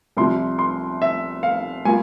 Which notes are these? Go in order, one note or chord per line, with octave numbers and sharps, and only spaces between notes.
C2 C3 F3 C6
C6
E5
F5
G3 A#3 F4 G#5